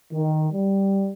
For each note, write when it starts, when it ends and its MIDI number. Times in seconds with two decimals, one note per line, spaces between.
0.12 0.48 51
0.54 1.10 55